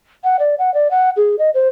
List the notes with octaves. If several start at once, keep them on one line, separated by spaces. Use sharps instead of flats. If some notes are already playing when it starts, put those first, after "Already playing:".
F#5
D5
F#5
D5
F#5
G#4
D#5
C5